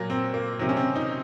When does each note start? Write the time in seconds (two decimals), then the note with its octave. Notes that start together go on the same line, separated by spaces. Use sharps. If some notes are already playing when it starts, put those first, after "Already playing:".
Already playing: A#2 F#3 A#3
0.10 C4
0.34 A#3
0.59 C3 D#3 F#3 C4
0.69 C#4
0.77 C4
0.96 D#4